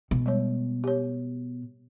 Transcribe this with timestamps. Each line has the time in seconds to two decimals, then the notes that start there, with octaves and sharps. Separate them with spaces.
0.11 B2
0.26 G3 G#3 C#5
0.84 G4 C#5